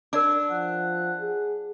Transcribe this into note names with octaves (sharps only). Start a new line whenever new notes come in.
D4 A#4 D5 D6
F3 F#5
G#4